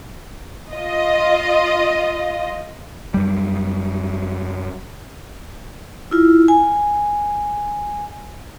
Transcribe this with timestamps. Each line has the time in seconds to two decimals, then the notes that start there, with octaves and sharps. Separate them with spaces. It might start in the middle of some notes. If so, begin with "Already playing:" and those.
0.72 F4 D#5
3.14 F#2 G3
6.11 E4 F4
6.48 G#5